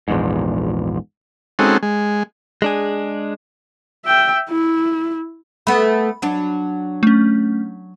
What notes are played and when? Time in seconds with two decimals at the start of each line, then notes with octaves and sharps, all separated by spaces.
0.08 A#1 E2 G#2
1.59 G#3 C4 C#4 D#4 F#4 A4
1.83 G#3
2.62 G#3 D4 G#4
4.05 E5 G5
4.49 E4
5.67 A3 B3 B5
6.22 F#3 D4
7.03 A3 C#4